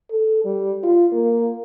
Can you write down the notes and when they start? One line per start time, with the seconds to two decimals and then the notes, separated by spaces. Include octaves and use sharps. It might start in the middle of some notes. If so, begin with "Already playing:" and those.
0.11 A4
0.45 G3
0.83 F4
1.13 A#3